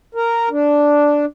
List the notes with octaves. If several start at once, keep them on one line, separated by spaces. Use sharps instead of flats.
A#4
D4